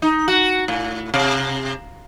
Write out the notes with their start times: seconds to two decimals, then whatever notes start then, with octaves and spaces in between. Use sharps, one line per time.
0.02 D#4
0.28 F#4
0.68 A2
1.14 C3